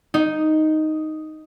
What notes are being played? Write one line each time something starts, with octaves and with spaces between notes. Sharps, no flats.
D#4